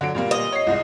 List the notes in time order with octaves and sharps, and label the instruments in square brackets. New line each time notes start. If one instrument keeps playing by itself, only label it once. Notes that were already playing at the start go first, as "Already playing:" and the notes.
[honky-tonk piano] D3 F#3 D7
A#2 G3 A#3
[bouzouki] D#5
[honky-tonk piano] C#5 C7
C2 G#2 D#4